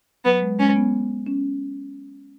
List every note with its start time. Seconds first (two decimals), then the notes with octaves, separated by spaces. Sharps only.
0.25 F#3 B3
0.42 G#3
0.59 G#3 C#4
0.76 B3
1.27 C#4